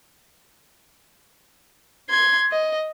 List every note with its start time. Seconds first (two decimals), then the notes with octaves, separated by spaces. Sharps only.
2.10 C6 G#6
2.52 D#5